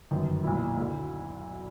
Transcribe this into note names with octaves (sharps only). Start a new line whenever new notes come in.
G1 F#2 D#3
B1 A#2 E4
D2 D3